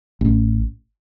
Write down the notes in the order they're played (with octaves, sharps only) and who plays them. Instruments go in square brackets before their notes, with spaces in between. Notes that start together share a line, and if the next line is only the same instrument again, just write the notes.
[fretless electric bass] A1